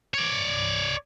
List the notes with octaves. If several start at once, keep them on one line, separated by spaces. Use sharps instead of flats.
C#5 D5